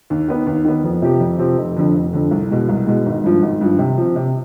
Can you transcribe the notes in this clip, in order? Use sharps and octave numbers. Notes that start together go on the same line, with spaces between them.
D#2
D#3 B3
D#2
D#3 B3
F2
C3 F3 C4 G4
F2
C3 F3 C4 G4
F1
F2 D3
F1
F2 D3
C2
B2 G#3
C2
B2 G#3
G#1
G2 F3
G#1
G2 F3
C3
F3 C4
C3